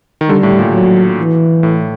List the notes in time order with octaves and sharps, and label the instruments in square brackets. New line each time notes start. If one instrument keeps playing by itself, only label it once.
[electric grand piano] D#3
[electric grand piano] D3 [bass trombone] G3
[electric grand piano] A2
A#2
[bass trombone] F#3
E3
[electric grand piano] A2